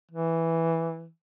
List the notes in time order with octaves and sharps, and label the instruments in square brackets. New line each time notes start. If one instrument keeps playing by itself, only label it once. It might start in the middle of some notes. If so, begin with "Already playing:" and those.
[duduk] E3